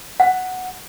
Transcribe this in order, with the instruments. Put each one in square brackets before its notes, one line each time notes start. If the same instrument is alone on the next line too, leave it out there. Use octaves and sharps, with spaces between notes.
[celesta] F#5